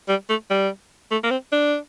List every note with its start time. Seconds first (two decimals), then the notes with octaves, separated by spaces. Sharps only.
0.08 G3
0.29 A3
0.50 G3
1.11 A3
1.23 A#3
1.30 C4
1.52 D4